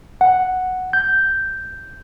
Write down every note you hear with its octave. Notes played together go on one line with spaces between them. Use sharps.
F#5
G6